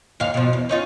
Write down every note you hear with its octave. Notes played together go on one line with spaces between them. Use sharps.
D#2 G#2 F5
B2 F3
E2
C#4 D#4 F4